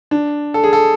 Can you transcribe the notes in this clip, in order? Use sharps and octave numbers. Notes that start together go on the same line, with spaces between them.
D4
A4
G#4
A4